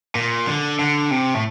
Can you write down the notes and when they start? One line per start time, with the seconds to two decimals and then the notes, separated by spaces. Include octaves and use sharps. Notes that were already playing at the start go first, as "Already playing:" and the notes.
0.15 A#2
0.47 D3
0.79 D3
1.11 C3
1.35 A2